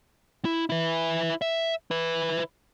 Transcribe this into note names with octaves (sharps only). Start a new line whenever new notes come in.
E4
E4 B4
E5
E4 B4